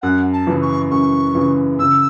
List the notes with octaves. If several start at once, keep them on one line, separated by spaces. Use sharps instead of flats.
F#2 F#5
A5
C#3 E3
C#6
F#2 C#6
C#3 E3
C#3 E6